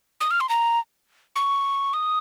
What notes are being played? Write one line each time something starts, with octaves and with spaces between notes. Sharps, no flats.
D#6
F6
C6
A#5
C#6
D#6